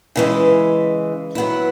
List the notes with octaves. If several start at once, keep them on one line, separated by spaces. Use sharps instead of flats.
C#3 E3 G#3
F#3 B3 E4